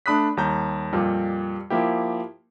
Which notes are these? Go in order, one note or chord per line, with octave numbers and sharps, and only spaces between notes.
A3 D4 B5 D#6 F#6 B6
D#2 G3 A#5 G6
F2 A#2 G3
F3 A#3 E4 G4